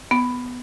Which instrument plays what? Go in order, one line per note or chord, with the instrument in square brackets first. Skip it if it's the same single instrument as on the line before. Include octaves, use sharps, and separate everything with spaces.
[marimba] B3